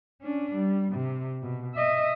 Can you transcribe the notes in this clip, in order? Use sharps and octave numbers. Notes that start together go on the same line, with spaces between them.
C#4 D4
G3
C3
B2
D#5 E5